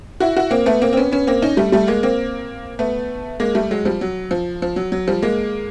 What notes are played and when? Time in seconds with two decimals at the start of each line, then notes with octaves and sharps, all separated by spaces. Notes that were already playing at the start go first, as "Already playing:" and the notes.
0.20 E4 F#4
0.36 E4 F#4
0.51 A#3 C4
0.66 A3 B3
0.82 A#3 C4
0.93 C4
0.97 B3 C#4
1.12 B3 C#4
1.27 A#3 C4
1.42 C#4 D#4
1.57 G3 A3
1.72 G3 A3
1.87 G#3 A#3
2.03 A#3 C4
2.79 A3 B3
3.40 G#3 A#3
3.55 G3 A3
3.71 F#3 G#3
3.85 F3 G3
4.01 F#3
4.31 F3
4.62 F3
4.76 F#3
4.92 F#3
5.08 F3 G3
5.22 G#3 A#3